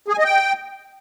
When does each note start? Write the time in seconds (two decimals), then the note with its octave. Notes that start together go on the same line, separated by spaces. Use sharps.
0.08 G#4
0.13 G#5
0.19 D#5
0.24 G5